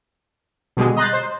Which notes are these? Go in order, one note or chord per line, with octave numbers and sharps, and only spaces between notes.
B2 D3 G3 G#3 G#4
D#5 A#5 C6 F#6 G6 A6
C5